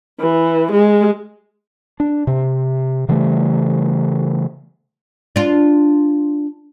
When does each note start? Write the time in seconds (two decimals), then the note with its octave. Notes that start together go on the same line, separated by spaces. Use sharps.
0.19 E3
0.71 G#3
2.00 D4
2.27 C3
3.09 C#3 E3 G3 A3
5.36 D4 F4